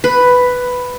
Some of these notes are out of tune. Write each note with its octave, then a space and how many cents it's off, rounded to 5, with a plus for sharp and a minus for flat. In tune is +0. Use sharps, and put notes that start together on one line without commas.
B4 +5